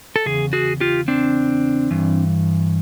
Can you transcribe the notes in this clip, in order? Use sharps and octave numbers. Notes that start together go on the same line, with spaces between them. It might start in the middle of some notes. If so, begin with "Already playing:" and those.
A4
E2 C#3 G#4
F#4 G#4
F4 G4
C4 D4
G2 E3